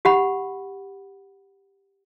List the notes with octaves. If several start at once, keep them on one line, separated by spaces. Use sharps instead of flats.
G4 F#5 B5